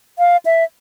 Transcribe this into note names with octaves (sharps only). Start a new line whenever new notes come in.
F5
E5